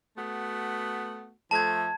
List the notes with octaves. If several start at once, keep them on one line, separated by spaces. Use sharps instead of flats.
A3 B3 F#4
F3 A3 A5 G#6